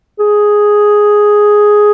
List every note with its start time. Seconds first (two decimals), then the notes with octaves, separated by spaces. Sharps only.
0.20 G#4